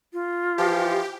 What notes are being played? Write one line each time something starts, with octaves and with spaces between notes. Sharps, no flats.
F4
E3 F3 G4